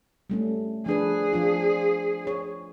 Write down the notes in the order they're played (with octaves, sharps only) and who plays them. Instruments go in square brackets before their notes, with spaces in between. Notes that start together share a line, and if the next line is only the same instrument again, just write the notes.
[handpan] G3 A3 C#4
[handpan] F3 D4 B4 [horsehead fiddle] G#4
[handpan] F3 D4 F4
C#5